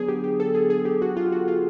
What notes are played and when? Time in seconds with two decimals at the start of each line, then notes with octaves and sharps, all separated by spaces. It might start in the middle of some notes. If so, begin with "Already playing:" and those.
Already playing: D3 F#3 B3 D4 G#4
0.09 G4
0.24 G4
0.40 A4
0.55 G#4
0.70 G#4
0.85 G4
1.02 F#4
1.17 F4
1.32 F#4
1.48 F4